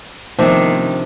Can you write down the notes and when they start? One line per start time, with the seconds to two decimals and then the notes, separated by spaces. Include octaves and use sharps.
0.39 C3 D#3 F3 A3 B3 D4